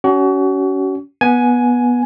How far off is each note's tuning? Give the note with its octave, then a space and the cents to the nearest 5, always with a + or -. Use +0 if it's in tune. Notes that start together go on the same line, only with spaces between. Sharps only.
C#4 +25 F#4 +35
B3 -15 G#5 +10